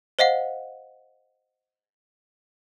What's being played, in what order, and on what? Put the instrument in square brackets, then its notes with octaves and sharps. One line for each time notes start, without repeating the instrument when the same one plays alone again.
[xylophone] C5 D#5 F5 F#5